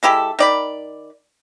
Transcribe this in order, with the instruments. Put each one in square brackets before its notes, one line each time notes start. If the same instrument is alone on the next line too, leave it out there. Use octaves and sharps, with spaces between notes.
[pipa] G#3 E4 G4 A4
D#3 D5 B5